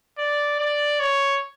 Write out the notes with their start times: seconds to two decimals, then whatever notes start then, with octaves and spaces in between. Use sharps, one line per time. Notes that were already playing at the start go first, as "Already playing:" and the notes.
0.18 D5
0.60 D5
1.00 C#5